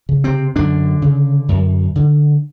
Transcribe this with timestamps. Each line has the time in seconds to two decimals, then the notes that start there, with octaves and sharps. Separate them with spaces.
0.09 C#3
0.24 C3 C4
0.56 F#2 D3 D4
1.02 C#3
1.49 F#2
1.96 D3